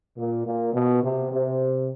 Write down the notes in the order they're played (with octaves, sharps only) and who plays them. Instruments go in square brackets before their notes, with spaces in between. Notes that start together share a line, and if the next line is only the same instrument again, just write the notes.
[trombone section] A#2
A#2
B2
C3
C3